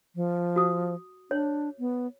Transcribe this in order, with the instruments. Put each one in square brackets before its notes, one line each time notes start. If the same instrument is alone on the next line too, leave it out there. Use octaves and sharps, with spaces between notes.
[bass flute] F3
[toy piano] F#4 D#6
[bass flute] D4 [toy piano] C#5
[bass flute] B3